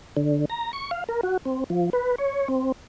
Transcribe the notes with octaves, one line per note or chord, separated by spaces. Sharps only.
D3
A#5
C#6
F5
A#4
F#4
C4
F3
B4
C#5
C4